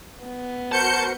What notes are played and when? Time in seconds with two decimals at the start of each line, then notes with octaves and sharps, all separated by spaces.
0.23 B3
0.72 F#4 A#4 C5 A5 G6 C#7